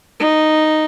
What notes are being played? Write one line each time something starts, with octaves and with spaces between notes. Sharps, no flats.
D#4